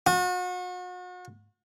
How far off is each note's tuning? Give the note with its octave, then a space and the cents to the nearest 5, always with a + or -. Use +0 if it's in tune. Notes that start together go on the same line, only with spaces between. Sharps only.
F#4 -40